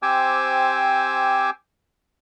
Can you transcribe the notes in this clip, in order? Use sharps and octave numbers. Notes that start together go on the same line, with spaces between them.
C4 G4 C5 G#5 D6 E6